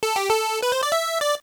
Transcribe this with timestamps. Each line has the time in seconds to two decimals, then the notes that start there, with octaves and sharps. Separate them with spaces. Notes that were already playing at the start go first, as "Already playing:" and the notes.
0.03 A4
0.16 G4
0.30 A4
0.63 B4
0.72 C5
0.83 D5
0.92 E5
1.21 D5